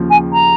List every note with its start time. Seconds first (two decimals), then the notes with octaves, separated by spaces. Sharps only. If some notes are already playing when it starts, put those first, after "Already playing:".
Already playing: D#2 C#3 F3
0.10 G#5
0.33 A#5